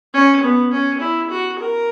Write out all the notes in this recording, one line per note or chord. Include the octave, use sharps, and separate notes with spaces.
C#4
B3
C#4
E4
F#4
A#4